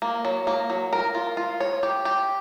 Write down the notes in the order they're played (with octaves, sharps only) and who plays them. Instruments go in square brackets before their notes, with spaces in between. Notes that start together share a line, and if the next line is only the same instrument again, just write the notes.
[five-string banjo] A#3
F#3
A#3
F#3
A#4
F4
F4
C#5
G4
G4